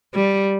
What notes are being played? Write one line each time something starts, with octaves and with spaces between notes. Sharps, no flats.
G3